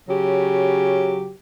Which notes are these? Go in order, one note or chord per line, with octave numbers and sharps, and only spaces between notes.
C#3 F#3 G4